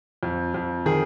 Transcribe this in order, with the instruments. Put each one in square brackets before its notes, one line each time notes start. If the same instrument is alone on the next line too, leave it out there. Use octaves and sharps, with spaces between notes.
[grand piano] F2
F2
D#3 G#4